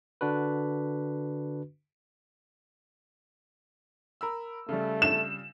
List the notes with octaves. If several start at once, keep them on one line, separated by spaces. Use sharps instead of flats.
D3 D4 F#4 B4
A#4 B5 E6
C#3 G3 A3
E7